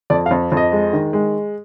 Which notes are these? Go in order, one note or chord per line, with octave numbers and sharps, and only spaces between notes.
F2 D5
F5
F2
F2
D#5
G#3
D#3
G#3